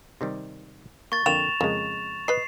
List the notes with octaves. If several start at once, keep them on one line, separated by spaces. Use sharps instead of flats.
C3 D#3 G3
A#3 C#6 A6
F2 D3 A#3 G5 E7 F7
F2 C#3 G#3 A#3
B4 D#5 C7